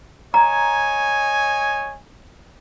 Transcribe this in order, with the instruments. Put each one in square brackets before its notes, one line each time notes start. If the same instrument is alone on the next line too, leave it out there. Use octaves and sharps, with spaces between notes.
[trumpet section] C#5 D#5 G#5 [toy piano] A#5